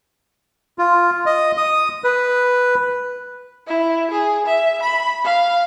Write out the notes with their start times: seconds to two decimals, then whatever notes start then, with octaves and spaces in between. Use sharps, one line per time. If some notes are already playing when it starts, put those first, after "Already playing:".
0.79 F4
1.26 D#5
1.57 D#6
2.04 B4
3.67 E4
4.11 G#4
4.46 E5
4.82 B5
5.25 F5